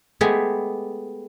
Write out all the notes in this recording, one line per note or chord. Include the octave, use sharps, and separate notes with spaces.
G#3 A3 B3 G4 G#4